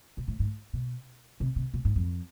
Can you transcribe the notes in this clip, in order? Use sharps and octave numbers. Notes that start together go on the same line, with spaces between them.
B2
A2
G#2
B2
C3
C3
B2
G#2
F2